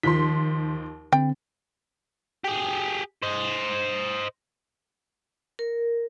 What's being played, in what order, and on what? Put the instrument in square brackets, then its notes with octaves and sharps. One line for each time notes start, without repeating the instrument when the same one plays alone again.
[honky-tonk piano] D#2 F3 C6 [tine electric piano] D#3 B6
[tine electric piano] D3 C4 [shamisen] G5
[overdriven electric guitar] G4 G#4
C5 D#5
[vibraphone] A#4